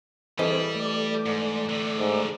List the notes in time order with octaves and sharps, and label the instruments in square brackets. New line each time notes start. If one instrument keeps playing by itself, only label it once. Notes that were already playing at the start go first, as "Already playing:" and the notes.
[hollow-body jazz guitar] E3 A4 D#5 [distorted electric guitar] G3 [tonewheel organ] C4 G#4 C5
[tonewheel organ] A3 D5
[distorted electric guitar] G#2
A2 D3
[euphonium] G#2